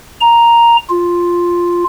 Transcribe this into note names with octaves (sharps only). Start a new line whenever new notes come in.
A#5
F4